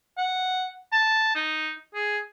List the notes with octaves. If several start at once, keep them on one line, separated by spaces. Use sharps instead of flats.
F#5
A5
D#4
G#4